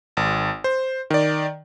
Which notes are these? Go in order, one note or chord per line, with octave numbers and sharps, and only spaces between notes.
G#1
C5
D#3 D5